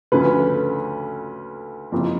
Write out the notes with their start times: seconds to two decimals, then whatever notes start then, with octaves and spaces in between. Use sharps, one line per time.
0.12 D2 C#3 F3 A3 C#4 B4
1.92 F#1 F2 F3